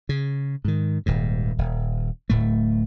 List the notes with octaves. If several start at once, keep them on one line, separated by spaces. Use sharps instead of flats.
C#3
G#2 D#3
D#1 D#2 G#2
D#1
D1 A2 A3